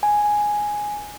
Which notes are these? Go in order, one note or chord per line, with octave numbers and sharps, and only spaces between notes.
G#5